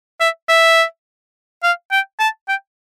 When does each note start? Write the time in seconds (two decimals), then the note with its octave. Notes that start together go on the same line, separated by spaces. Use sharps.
0.20 E5
0.49 E5
1.63 F5
1.91 G5
2.19 A5
2.48 G5